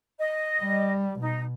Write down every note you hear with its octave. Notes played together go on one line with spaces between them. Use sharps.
D#5
G3
B2 D#4